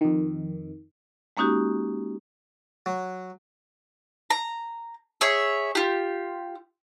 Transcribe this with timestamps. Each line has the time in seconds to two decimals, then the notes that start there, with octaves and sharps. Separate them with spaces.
0.01 F2 D#3
1.37 G#3 A#3 C#4 D#4 F#4 G4
2.86 F#3
4.30 A#5
5.21 G#4 C#5 E5
5.75 F4 G4